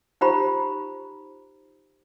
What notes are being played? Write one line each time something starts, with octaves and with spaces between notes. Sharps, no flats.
D#4 F4 G4 C5 A#5 B5